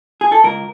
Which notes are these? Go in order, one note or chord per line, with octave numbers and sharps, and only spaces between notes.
G#4
A4
C#2 A#4